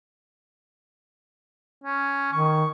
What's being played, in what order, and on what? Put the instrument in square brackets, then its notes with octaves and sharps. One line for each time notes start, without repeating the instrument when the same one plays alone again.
[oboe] C#4
[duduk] D#3 [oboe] C#6